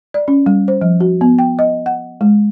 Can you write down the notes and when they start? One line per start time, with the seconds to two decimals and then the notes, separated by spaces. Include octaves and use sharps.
0.14 D5
0.28 C#4
0.46 G3
0.68 C5
0.81 F3
1.00 F#4
1.21 B3
1.39 G5
1.59 D#5
1.86 F#5
2.21 G#3